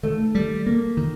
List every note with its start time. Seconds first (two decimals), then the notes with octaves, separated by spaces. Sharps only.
0.03 D#3 A3
0.35 G3
0.66 A#3
0.97 D#3